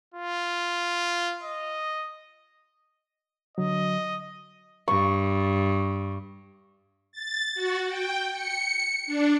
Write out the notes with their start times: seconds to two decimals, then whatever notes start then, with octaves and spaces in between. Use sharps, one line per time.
0.14 F4
1.43 D#5
3.58 D3 F#3 D#5
4.88 G2 C#6
7.12 A6
7.55 F#4
7.88 G5
8.33 C#7
9.07 D4